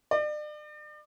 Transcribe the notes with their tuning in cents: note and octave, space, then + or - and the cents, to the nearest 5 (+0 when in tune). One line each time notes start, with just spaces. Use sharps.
D5 +40